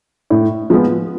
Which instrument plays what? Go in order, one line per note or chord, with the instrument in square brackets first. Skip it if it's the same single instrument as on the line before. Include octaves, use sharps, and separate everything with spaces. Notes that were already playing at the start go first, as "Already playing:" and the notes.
[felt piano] A2
F3 G#3 B3